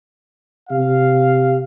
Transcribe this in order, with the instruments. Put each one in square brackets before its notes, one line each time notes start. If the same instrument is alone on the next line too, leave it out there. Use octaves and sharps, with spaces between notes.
[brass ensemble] C3 G4 F5